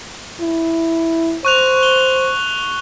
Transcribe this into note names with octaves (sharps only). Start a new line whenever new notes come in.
E4
C5 C#6 F#6 F7
G7